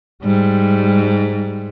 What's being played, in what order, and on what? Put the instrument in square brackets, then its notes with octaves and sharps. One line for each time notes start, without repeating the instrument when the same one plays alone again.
[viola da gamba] G#2 [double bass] G3